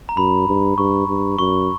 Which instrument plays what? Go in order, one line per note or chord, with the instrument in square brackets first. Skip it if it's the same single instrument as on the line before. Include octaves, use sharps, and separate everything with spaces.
[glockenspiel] A#5
[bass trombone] F#2 [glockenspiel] B5
[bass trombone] G2
[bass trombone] G2 [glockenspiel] C#6
[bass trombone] G2
[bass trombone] F#2 [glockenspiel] C#6